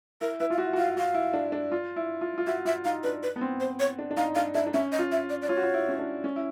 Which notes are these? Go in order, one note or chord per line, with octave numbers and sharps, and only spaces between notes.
E4 A#4
E4 B4
F4 F5
F#4 E5
F#4
F4 F5
F#4 F5
E4
D4
D4
F4
E4
F4
F4
F#4 E5
F4 E5
D#4 F5
D4 B4
B4
B3
C4
C5
C#5
D4
D4
D#4 F5
D4 F5
D4 E5
D4
C#4 E5
D#5
F4
E5
D5
D5
F4 C#5
F#4
F4
E4
C#4
D4
C#4
E4